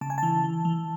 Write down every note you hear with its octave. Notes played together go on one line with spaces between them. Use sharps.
C#3 A5
G#5
E3 A5
E3
E3